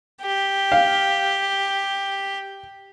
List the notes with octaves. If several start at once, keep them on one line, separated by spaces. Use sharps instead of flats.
G4
F5